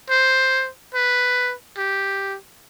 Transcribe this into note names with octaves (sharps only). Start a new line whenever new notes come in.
C5
B4
G4